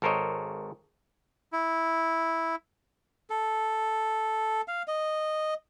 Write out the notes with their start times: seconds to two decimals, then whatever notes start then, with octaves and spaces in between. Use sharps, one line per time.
0.02 G#1 A4 A#4 C5 C#5 D#5
1.53 E4
3.30 A4
4.68 F5
4.88 D#5